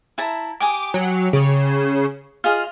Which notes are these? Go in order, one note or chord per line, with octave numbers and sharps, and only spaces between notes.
E4 A5 A#5
G4 G#5 D6 D#6
F#3
C#3
F4 G#4 D#5 F6